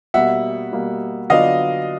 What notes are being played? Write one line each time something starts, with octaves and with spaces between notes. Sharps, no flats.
B2 G3 A#3 E5 F#5
B2 G3 A#3
D3 F#3 B3 D4 F4 D#5 F5